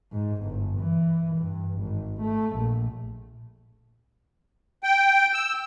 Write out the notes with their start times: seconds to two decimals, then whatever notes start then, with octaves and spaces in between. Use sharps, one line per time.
0.13 G#2
0.43 G1
0.79 E3
1.37 G2
1.79 G#1
2.21 A3
2.57 A#1
4.83 G5
5.33 E6